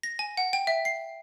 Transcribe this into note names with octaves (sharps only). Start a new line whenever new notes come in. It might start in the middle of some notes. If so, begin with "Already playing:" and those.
A#6
G#5
F#5
G5
E5
C7